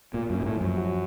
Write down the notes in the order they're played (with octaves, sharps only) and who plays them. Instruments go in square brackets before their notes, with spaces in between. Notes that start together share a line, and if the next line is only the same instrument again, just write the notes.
[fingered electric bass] A#2 [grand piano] A#3
[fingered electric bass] F#2
[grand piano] C#4
[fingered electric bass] A#2
A2
[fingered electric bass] F#2 [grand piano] F3
[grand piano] F#4